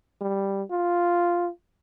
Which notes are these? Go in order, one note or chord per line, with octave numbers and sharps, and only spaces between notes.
G3
F4